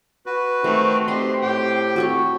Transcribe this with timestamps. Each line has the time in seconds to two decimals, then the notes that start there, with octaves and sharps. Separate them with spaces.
0.26 F#4 B4
0.64 D#3 A3 C4
1.08 C4 G4 D#5 C6
1.43 A2 G4 G5
1.96 F#4 A4 C#5